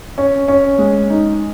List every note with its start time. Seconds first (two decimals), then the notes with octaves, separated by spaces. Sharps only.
0.18 C#4
0.48 C#4
0.78 G#3
1.10 D#4